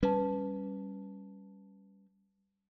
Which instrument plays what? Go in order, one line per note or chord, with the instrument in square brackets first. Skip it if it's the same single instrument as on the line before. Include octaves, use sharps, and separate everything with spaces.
[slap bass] G3 C#4 [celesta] B4 A5